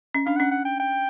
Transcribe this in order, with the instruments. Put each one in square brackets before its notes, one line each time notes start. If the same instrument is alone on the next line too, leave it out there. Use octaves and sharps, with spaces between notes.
[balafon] C#4
[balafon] D4 [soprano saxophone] F5
[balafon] C#4 [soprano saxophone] F#5
[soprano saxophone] F#5
G5
G5